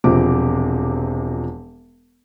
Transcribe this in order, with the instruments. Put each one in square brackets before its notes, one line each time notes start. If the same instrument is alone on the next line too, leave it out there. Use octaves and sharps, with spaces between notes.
[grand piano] E1 C3 F3 D6